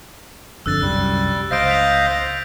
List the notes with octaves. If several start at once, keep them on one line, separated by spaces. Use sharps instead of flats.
G1 F2 D3 E6 F#6 A6
C2 F#2 G3
C#2 C5 D#5 F5 A#6 D7
G6 B6 F7